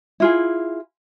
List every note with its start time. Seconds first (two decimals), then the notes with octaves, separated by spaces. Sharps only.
0.20 E4 F4 G#4